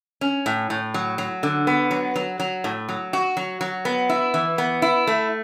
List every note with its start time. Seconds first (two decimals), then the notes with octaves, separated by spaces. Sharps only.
0.21 C#4
0.46 A2
0.70 A2
0.94 F#3
1.18 F#3
1.43 D3
1.67 B3
1.91 F#3
2.16 F#3
2.40 F#3
2.64 A2
2.89 F#3
3.13 F#4
3.37 F#3
3.61 F#3
3.85 B3
4.09 E4
4.34 E3
4.58 B3
4.82 E4
5.07 A3